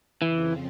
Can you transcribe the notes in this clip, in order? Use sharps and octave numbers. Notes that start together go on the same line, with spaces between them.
F2 C#3 E3 F3 C4